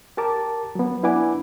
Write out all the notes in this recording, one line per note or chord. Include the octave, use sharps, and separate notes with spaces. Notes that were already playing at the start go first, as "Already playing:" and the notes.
G4 A#4 A5 D6
F#3 B3
D4 E4 B4 F#5 G#5 D6